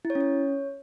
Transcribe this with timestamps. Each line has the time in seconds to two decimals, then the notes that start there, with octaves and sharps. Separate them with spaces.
0.05 E4
0.10 C#5
0.15 C#4
0.21 C#5